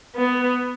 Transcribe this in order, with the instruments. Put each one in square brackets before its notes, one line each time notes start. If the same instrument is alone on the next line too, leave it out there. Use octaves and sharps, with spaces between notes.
[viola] B3